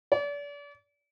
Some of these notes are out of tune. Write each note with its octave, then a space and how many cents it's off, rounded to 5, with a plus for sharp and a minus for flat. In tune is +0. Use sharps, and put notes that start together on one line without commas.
D5 -35